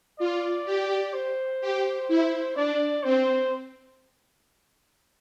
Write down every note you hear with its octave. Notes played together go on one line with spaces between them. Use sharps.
F4 D5
G4
C5
G4
E4
D4 D5
C4 C5